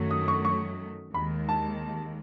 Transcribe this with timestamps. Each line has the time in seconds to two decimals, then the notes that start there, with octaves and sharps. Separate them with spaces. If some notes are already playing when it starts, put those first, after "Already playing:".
Already playing: F#2 D#3 F#3 A3
0.11 D#6
0.28 C#6
0.45 C#6
1.14 D#2 D#3 G#3 B5
1.49 A5